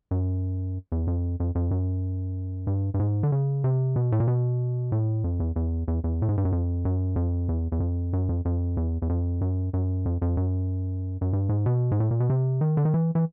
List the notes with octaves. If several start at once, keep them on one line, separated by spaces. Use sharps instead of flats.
F#2
E2
F2
F2
F2
F#2
G2
G2
G#2
D3
C#3
C3
B2
A2
A#2
B2
A2
F2
E2
E2
E2
E2
A2
G#2
G2
F#2
F2
F#2
F2
E2
E2
F2
F#2
F2
F2
E2
E2
F2
F#2
F#2
F2
F2
F#2
F#2
G2
G#2
B2
G#2
A2
A#2
B2
C3
D#3
D3
D#3
E3
E3